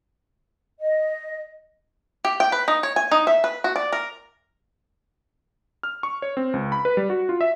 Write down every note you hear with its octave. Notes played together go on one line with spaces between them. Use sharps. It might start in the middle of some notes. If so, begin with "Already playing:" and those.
D#5
G4
G5
B4
D#4
C#5
G#5
D#4
E5
B4
F#4
D5
A#4
F6
C#6
C#5
C4
C#2
B5
B4
G3
F#4
F4
E5